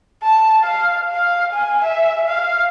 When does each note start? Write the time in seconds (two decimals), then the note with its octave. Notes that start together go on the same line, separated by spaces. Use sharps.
0.23 A5
0.63 F5
1.12 F5
1.52 G#5
1.84 E5
2.28 F5